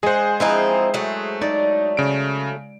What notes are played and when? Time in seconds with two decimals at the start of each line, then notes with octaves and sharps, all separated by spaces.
0.03 G#3 G#4 C5 F#5
0.40 F3 C4 D#4 E4 B4
0.94 F#3 A3
1.41 D#4 D5
1.97 C#3 D7